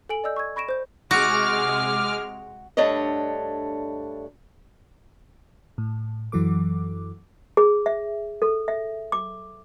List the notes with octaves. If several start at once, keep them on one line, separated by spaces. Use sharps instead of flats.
A4 G#5 D7 F#7
D5 D#5 E6 G6
C#6 E6 G#6
B5 C#6 A#6 D7 E7
C5 G6
C3 G#3 F#4 D6 F6
G2 A3 D4 C#5 D#5
A2
F#2 E3 F#3 A4 D6
G#4
E5
A4
E5
D6